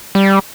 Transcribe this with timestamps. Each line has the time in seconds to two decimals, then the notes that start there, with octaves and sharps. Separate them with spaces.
0.15 G3